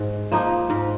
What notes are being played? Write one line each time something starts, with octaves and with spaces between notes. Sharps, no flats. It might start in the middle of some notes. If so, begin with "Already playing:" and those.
Already playing: G#2
F3 A#3 D#4
G#2